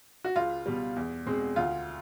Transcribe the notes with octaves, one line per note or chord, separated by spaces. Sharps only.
F#4
C#2 F4
B2 G3
E2
B2 G#3 C4
D2 F4